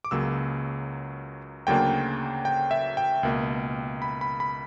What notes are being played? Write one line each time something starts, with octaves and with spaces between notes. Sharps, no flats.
D6
C#2 C#3 F#3 A#3 E6
D2 C#3 F#3 A#3 D4 G5
G5
E5
G5
C#2 B2 A#3
B5
B5
B5